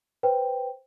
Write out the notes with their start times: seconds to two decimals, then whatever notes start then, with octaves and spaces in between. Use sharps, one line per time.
0.23 B4 C5 G5